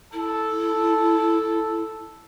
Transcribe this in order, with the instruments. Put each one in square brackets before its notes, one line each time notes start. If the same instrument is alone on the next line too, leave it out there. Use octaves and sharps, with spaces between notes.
[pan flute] E4 [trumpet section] A4